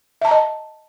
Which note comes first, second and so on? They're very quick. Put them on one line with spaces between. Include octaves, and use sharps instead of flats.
E5 A5 A#5 D#5